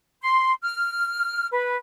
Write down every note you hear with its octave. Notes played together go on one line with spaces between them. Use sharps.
C6
F6
B4